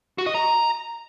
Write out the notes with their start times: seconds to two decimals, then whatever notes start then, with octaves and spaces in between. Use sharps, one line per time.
0.18 F#4
0.26 D#5
0.35 A#5